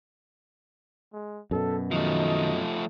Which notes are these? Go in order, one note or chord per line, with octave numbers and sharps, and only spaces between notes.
G#3
F#2 B2 A4
D#3 F3 A3 D#4 F#4 D#5